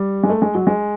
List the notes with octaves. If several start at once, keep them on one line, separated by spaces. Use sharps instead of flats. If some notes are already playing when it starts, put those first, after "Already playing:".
Already playing: G3
G#3
A3
G#3
F#3
G#3